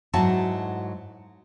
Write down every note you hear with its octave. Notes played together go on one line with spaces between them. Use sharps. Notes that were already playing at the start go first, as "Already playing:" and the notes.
G#2 F#3 A3 E4 F#4 A5